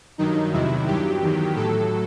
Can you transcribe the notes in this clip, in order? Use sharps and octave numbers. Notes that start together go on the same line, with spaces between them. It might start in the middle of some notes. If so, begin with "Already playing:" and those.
G2 D#3 F#3 D#4
E2 C3 D#3 F#3 E4
G2 F#3 G4
E2 D#3 F#3
A2 F#3 A4